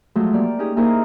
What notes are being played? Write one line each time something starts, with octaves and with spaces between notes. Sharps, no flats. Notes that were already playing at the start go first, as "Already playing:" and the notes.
F3 F#3 G#3 A3
A#3 G4 D5
C#4 D#4 G4 G#4
A#3 D#4 E4 G#4 A#4 C5